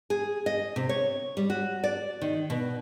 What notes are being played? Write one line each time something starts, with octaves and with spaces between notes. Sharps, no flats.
G#4
D#5
C3
C#5
G3
F#4
D5
D#3
B2